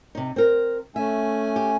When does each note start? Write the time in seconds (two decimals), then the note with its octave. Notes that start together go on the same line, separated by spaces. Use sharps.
0.15 C3 D#4
0.36 C4 A#4
0.96 A3 C#4 E5 G#5
1.56 G4